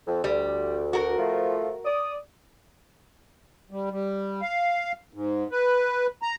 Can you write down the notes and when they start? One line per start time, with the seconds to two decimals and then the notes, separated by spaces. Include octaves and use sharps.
0.06 F2
0.24 D2 G3
0.93 F#4 A#4
1.17 F3 A3 F4
1.84 D5 D#6
3.71 G3
3.91 G3
4.42 F5
5.13 G#2
5.51 B4
6.22 A#5